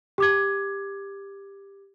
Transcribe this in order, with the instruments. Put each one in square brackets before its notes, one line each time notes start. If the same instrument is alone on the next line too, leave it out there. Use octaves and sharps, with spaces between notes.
[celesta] G4 D6 G#6